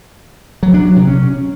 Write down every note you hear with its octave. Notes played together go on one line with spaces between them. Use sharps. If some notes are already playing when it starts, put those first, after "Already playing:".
F#3
D4
F#3
C3
C#4